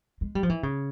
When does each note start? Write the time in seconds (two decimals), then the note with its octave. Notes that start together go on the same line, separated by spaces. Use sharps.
0.21 G#3
0.35 G3
0.43 F3
0.50 E3
0.63 C#3